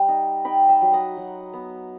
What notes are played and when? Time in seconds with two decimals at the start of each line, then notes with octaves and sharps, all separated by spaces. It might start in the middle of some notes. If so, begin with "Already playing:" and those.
Already playing: G3 F#5
0.08 D#4
0.45 D#4 G5 B5
0.68 E5 G5
0.82 F#3
0.93 D#5 F#5
1.17 F#3
1.53 B3